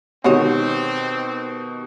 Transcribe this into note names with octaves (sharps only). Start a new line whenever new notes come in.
B2 D#3 G#3 C4 F#4 G4 C#5